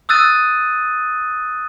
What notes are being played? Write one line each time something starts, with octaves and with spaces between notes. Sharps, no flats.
D#6 E6 F#6 A6 D#7